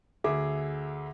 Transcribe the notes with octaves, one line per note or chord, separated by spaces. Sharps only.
D2 G#4 E5 D6